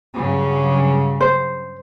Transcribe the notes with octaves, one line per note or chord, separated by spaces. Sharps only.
G2 C#3 F#3
C5